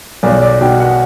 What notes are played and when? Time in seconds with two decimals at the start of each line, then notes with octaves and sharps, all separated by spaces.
0.23 B1 D5
0.41 D5
0.61 B2 G5
0.80 F#5